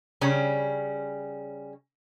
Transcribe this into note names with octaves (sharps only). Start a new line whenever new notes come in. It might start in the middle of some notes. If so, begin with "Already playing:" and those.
C#3 G3 C#4